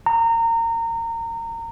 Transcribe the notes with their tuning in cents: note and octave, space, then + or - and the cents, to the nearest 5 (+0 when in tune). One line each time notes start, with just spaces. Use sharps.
A#5 -25